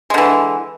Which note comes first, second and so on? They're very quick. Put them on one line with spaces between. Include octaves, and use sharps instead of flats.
G#3 D3 E3